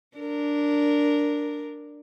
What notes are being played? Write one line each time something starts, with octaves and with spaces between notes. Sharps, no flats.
D4 A#4